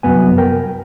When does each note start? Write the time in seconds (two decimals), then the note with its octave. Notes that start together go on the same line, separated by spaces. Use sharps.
0.03 C2 F#2 B3 G#5
0.38 A#4 G5